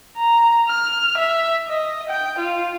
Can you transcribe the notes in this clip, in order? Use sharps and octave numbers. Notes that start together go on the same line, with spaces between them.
A#5
F6
E5
D#5
G5
F4